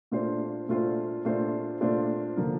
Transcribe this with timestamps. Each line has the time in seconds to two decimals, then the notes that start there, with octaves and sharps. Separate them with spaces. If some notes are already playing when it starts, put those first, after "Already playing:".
0.12 A#2 A3 D4 F4 C5
0.69 A#2 A3 D4 F4 C5
1.25 A#2 A3 D4 F4 C5
1.81 A#2 A3 D4 F4 C5
2.37 D3 F3 A#3